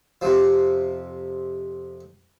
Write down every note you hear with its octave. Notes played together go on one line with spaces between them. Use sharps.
F2 C3 F3